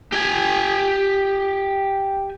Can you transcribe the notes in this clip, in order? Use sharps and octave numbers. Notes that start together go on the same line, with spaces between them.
G4 G#5